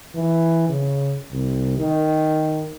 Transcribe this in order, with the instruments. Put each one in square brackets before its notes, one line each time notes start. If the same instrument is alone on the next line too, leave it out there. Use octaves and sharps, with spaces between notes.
[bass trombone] E3
C#3
C2
D#3